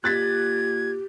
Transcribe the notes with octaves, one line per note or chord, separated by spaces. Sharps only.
A#2 G4 F#6 G#6 A6 B6